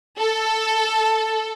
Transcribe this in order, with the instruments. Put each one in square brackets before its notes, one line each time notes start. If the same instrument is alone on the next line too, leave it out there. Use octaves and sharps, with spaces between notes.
[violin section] A4